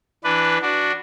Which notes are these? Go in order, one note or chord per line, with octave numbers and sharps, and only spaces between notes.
E3 D4 B4
D4 F#4